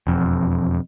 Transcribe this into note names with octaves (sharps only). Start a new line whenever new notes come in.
E1 F2